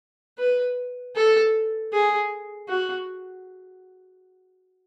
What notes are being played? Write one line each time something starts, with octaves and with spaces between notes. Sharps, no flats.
B4
A4
G#4
F#4